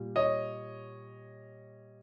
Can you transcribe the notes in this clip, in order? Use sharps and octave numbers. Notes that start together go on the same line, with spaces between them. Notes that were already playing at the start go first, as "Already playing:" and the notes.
Already playing: A#2 G3
C#5 D#5